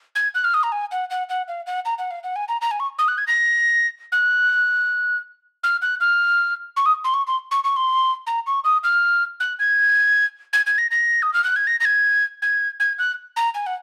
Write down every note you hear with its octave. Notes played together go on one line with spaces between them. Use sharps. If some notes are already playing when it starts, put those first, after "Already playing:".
G#6
F#6
F6
D#6
A#5
G#5
F#5
F#5
F#5
F5
F#5
A#5
F#5
F5
F#5
G#5
A#5
A#5
G#5
C#6
D#6
F#6
G#6
A#6
F#6
F6
F#6
F6
C#6
D#6
C6
C#6
C6
C#6
C#6
C6
A#5
C#6
D#6
F6
F#6
G#6
G#6
G#6
A#6
A#6
D#6
F6
F#6
G#6
A#6
A#6
G#6
G#6
G#6
F#6
A#5
G#5
F#5